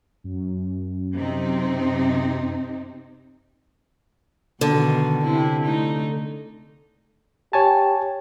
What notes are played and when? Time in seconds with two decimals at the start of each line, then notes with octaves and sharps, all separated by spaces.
0.24 F#2
1.15 C3 C4 D#4
4.61 B2 D3 D#3
5.24 C3 E4
5.66 A3 D#4
7.53 G4 C#5 G#5 A5